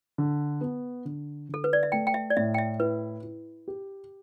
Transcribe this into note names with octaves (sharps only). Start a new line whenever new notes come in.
D3
B3
D3
D3 A4
B4
D5
E5
A3 G5
G5
E5
D5
A2 E5
G5
E5
E4 B4
E4
G4